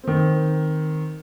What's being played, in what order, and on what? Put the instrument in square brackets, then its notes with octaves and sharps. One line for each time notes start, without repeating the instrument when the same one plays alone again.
[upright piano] D#3 C4